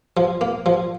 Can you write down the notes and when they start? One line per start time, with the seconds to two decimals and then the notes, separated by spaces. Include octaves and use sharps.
0.17 F3
0.41 A#3
0.66 F3